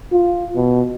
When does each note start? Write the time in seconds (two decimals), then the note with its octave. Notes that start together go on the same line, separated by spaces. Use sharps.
0.12 F4
0.56 B2